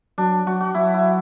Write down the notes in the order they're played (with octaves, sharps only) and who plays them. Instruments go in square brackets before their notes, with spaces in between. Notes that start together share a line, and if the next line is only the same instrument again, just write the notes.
[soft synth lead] F#3 [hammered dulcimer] D4
[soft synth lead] F#3 [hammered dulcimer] F#4
[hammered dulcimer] F#4
[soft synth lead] F#3 [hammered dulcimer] E4
[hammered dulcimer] E4